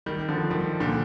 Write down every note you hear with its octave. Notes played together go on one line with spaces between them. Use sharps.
D#3 G3
D3 F3
D#3 G3
A#2 D3